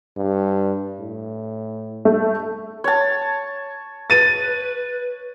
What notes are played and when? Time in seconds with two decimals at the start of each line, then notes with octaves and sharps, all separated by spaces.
0.17 G2
1.00 A2
2.05 A3
2.84 C#5 A5
4.10 B4 A6 D#7